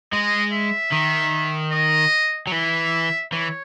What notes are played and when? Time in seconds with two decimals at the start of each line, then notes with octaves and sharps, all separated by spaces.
0.12 G#3 D#5
0.53 E5
0.92 D#3
1.72 D#5
2.47 F#3
2.52 E3 E5
3.32 E3 C#5